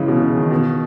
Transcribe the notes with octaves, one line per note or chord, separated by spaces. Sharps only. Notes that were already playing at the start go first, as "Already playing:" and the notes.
Already playing: C#3 E3 G#3
B2
C#3
D#3
B2